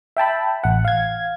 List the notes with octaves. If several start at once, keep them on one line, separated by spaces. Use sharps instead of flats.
E5 G5 A5 B5
A1 F#5
F5 G#6